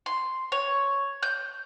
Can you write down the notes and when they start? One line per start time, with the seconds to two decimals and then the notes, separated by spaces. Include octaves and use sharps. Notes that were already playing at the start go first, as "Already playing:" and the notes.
0.06 C6
0.52 C#5
1.23 G6